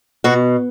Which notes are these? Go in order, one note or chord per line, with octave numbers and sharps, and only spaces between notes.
B2 F#4